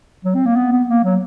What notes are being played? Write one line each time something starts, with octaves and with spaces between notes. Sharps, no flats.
F#3
C4
A#3
B3
B3
A#3
F#3